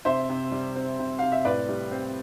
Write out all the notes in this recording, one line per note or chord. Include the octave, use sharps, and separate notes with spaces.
C3 C5 E5
C3
G3
C4
C3
C3 F5
E5
A2 B4 D5
G3
C4